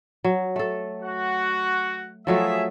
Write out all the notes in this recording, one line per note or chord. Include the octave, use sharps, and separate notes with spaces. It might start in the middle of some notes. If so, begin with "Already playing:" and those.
F#3
A3 A4
F#4 F#5
F3 F#3 A3 G#4 E5